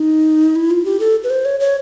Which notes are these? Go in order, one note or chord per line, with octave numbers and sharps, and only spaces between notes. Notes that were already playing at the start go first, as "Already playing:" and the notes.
Already playing: D#4
E4
F4
G4
A4
B4
C5
C#5
C#5